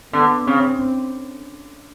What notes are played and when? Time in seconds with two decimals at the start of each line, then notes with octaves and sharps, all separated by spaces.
0.13 D3 B3
0.47 C#3 C4